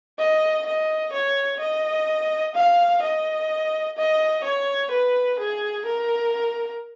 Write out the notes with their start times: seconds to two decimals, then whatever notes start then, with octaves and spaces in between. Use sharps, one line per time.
0.19 D#5
0.66 D#5
1.13 C#5
1.60 D#5
2.55 F5
3.02 D#5
3.97 D#5
4.44 C#5
4.91 B4
5.39 G#4
5.85 A#4